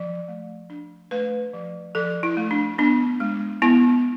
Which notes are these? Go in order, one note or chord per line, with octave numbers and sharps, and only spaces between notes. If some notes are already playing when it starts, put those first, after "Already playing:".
Already playing: F3
A3
D4
A3 B4
F3
F3 A4
E4
A3
D4
B3 D4
G#3
B3 E4